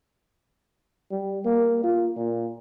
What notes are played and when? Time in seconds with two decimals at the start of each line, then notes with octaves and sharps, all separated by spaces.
1.11 G3
1.45 A#3
1.84 F4
2.16 A#2